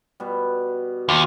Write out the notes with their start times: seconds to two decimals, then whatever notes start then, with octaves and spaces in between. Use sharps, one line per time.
0.20 B2 G3
1.09 D#2 F4